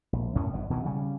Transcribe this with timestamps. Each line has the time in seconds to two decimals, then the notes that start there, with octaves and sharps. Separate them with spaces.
0.13 A#1
0.36 F#2 A2 C#4
0.53 G1 B2
0.70 B2 D#3 E3
0.85 C#3 G3 C#4